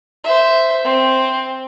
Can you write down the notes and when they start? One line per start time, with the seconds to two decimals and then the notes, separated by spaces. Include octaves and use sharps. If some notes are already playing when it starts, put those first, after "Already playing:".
0.24 C5 E5
0.84 C4